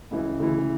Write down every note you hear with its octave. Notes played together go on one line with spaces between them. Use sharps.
C#2 C#3 E3
D2 C#3 E3